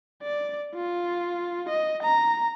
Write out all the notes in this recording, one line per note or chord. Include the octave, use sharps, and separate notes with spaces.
D5
F4
D#5
A#5